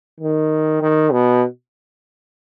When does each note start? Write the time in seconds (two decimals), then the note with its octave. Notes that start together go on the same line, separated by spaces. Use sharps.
0.21 D#3
0.82 D#3
1.12 B2